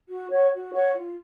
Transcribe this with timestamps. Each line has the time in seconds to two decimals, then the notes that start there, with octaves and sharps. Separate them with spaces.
0.09 F#4
0.29 C#5 F#5 C#6
0.52 F#4
0.73 C#5 F#5 C#6
0.94 F4